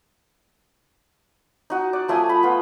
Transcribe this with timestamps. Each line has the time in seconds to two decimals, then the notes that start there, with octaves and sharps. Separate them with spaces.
1.70 D#4 F#4
1.93 D5
2.08 F3 A3 D#5 G#5
2.29 B5
2.43 B3 F4